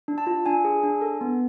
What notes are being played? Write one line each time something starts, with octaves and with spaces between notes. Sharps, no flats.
D4
A5
F4
D4 G#5
G#4
D4
A4
B3